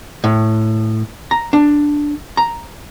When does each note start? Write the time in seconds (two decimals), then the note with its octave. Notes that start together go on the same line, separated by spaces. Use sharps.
0.24 A2
1.31 A#5
1.53 D4
2.37 A#5